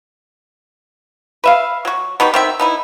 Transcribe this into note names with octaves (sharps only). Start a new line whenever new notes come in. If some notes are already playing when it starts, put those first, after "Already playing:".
B4 E5 F5
F#3 F#4
B3 D#4 F#4 G4
D#3 C4 E5
B3 D#4 E4